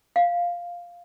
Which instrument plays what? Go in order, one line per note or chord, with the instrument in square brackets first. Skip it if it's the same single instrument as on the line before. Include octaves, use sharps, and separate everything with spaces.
[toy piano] F5